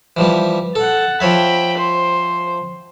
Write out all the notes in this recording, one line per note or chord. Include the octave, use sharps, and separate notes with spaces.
E3 F3 G3
A4 F#5 A5
F3 C#5 E5 G5 B5
C5